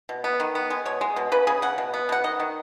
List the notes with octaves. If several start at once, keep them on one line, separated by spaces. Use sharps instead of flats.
B2
B3
D#3
B3
G#3
B2 C#5
G#3
B2
C#3 B4
C#3 G#4
C#3 F#5
B2
B3
B2 F#5
D#3 D#5
D#3